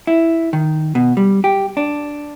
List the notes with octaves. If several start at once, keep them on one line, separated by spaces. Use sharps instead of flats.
E4
D#3
B2
G3
G4
D4